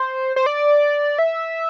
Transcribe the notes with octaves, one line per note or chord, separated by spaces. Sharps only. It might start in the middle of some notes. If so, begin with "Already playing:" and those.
Already playing: C5
C5
D5
E5